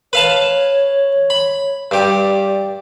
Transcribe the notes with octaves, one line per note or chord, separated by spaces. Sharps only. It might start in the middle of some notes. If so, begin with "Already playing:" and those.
B4 C#5 F5 A5
B5
G2 G4 D5